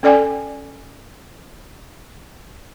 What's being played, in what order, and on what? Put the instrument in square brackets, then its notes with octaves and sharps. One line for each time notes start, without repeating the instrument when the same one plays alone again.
[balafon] C#4 A4 D5 G5 G#5